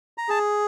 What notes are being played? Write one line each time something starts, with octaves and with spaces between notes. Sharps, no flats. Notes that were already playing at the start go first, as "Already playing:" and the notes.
A#5
G#4 A5